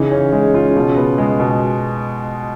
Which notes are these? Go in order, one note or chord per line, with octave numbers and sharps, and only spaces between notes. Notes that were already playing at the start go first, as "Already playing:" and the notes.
Already playing: C#3 E3 D#4
C#4
G#3
F4
B2
B3
G#3
B2